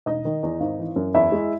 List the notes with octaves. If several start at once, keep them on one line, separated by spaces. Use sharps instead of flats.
E1 D#4 D#5
D#3
E2
G#1
E3
F#2
E2 E4 E5
G#3